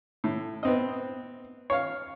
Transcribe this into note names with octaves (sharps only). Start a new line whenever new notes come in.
A2
B3 C4 D#5
C#5 F5